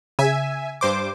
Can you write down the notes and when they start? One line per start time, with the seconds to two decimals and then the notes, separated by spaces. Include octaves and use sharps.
0.19 C#3 E5 G#5
0.81 G2 C5 D6